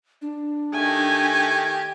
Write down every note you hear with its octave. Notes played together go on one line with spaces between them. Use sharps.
D4
D#3 A3 G4 G#5